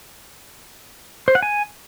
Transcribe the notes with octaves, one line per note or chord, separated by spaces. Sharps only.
C5
F#5
G#5